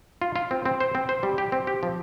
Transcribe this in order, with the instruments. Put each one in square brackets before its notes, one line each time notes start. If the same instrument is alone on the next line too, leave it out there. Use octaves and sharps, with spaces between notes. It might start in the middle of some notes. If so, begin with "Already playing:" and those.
[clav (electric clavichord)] F4
F4
C4
C4
C5
C4
C5
G3
G4
C4
G4
F3